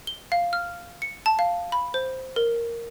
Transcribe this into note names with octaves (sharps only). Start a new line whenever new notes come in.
G7
F5
F6
C#7
A5
F5
B5
C5
A#4